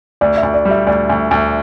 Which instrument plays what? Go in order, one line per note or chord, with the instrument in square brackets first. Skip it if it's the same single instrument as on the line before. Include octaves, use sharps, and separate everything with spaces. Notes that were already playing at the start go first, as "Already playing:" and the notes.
[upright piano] D2 [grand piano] D5
[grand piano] E5
[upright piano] D2
[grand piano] D5
[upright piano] G3
[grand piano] E5
[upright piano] D2 [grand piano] D5
[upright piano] D2
D2